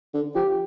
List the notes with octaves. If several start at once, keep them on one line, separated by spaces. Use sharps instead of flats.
D3
F3 G4